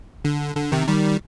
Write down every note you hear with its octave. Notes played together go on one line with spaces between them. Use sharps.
D3
D3
C3 D#3
D#3 G3